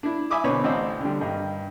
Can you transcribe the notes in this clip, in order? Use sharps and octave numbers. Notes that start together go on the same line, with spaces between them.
D4 E4
E5 G#5 B5 D6 D#6
B2 D3 C4 B4 C#5
A1 C4 D5 D#5 E6
D3 G3
G2 D#3